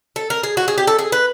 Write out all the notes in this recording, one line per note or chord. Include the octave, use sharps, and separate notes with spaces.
A4
A#4
G#4
F#4
G#4
G4
A4
G#4
B4